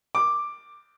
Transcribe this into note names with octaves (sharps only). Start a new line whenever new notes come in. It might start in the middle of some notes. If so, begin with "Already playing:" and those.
D6